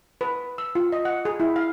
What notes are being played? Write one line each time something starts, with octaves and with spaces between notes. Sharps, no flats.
B4
E6
F4
D#5
F#5
G#4
E4
F5